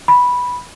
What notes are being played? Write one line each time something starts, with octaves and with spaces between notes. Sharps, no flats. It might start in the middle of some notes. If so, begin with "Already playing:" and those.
B5